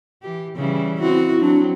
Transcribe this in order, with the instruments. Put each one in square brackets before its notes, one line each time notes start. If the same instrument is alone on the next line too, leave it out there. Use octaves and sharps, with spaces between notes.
[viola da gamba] E3 G4
C#3 E3 G3
[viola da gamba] C4 F#4 [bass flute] E4
[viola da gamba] F#3 C4 [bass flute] D4